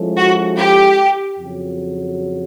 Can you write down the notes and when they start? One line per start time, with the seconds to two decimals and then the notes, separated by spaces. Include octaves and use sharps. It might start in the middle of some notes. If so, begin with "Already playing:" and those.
Already playing: F3 G#3 C#4 E4 A4
0.17 F#4
0.57 G4
1.38 F2 C#3 F#3